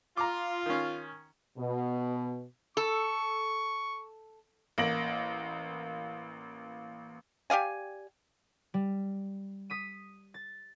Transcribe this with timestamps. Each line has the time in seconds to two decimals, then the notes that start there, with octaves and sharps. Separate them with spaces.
0.17 F4 A#5 D6
0.66 D#3 C#4
1.57 B2
2.77 A4 C#6
4.78 A1 A#3 A#6 D7 F#7
7.50 G4 D5 F5 G#5
8.74 G3
9.70 D#6 B6 D#7
10.34 A6